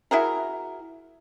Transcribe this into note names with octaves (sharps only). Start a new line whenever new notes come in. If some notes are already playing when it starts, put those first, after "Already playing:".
E4 F#4 G#4 A#4